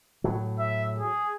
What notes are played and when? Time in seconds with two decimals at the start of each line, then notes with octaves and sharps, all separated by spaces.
0.24 A2 F#3
0.59 E5
0.99 G#4